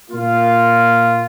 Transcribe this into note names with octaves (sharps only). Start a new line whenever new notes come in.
A#2 A#3 F4